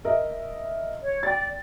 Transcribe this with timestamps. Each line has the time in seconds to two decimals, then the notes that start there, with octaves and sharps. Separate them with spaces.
0.05 A#4 D#5 E5
1.03 C#5
1.23 D5 G5 A6